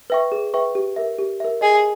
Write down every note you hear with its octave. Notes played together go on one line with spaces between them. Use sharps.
B4 E5 G5 C#6
G#4
B4 E5 G5 C#6
G4
A#4 E5
G4
A#4 E5
G#4 D#5